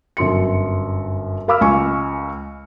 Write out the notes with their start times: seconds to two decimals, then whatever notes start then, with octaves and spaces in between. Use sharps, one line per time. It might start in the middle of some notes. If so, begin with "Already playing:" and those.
0.17 G1 F#2 C6 C#7
1.48 A#4 F5 B5 D6 E6 F6
1.61 C#2 G#5 C#6